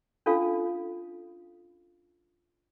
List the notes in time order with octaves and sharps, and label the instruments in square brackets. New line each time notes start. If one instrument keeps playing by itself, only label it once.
[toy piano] C#4 D4 F4 A4 F5